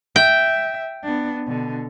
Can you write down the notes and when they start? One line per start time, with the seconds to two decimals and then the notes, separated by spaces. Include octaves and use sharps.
0.16 E5 G5
1.03 B3 D4
1.47 B2 D3